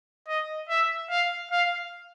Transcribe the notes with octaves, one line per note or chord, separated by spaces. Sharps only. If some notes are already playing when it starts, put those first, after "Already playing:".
D#5
E5
F5
F5